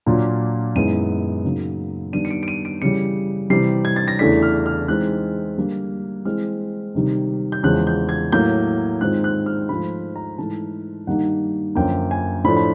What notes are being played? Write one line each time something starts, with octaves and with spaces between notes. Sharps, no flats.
A#2 F#3 A#3 D4 F4
F#2 D#3 G#3 B3 E4 D#7
C#3 F#3 A#3 D#4
D#3 G3 B3 D4 D#7
C#7
D7
D7
D#7
D7
C#3 E3 G3 C#7
C3 E3 G3 C7
G#6
A6
A#6
E2 C#3 E3 A3 D4 B6
F6
F6
E3 G#3 C4 D#4 F#6
D3 G3 A#3
E3 G#3 C4 E4 F6
C3 D#3 G3
G6
E2 C#3 F3 G#3 F#6
G6
G#6
A2 F#3 A#3 G6
G#2 D#3 G#3 C4 F4 F#6
F#6
F6
G#2 F3 A3 B5
A#5
G#2 E3 A3 A5
G2 D#3 G3 A#3 D#4 F#5
F#2 D3 F3 A#3 G5
G#5
A2 F3 A3 D4 F4 B5
B5